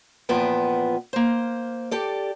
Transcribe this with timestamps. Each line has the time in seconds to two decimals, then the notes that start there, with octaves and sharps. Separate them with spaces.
0.29 E2 A#2 F3 B3 G5
1.13 A#3 C5
1.91 G4 A4 D5